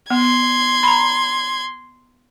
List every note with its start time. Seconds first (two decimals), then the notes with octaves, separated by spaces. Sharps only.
0.10 B3 C6 G#6
0.83 A#5 B5